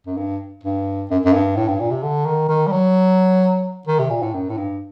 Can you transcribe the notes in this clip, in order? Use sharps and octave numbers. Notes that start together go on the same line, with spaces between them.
F#2
G2
G2
F#2
F#2
G2
A2
G2
A#2
C3
D3
D#3
D#3
G3
F#3
D#3
C3
A#2
A2
F#2
A2
G2